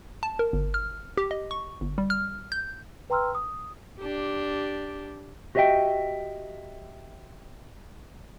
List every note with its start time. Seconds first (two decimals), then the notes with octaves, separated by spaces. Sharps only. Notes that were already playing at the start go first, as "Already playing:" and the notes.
0.23 A5
0.39 A#4
0.53 G1
0.74 F6
1.17 G4
1.31 D#5
1.51 C#6
1.81 G1
1.98 G3
2.10 F6
2.52 G6
3.10 B4 G5 A#5 C6 E6 F6
3.35 D#6
3.99 D4 G4
5.55 F#4 G4 C#5 D#5 E5 G5